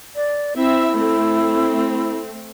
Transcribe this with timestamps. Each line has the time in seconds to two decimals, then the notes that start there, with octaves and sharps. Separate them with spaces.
0.16 D5
0.57 C4 E4 E5
0.96 A3 C4